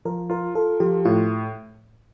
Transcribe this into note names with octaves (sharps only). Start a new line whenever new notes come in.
F3 A#4
F4 A#4
F4 A4
F3 G4
A2 F4